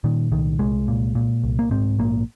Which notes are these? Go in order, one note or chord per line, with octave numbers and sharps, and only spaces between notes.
A#2 D#3
C2 D#3
C2 G#3
A#2
A#2
C2
A#3
G#2 C4
A#1 A#3